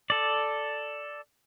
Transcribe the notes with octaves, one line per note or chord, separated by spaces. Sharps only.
A4 D5